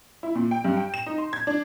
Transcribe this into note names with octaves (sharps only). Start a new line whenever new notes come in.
E4
A#2
G5
G2
G5
E7
D#4
C6
G#6
D4